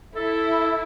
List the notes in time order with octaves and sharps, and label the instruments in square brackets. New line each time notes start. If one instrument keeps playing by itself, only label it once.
[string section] E4 [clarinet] A4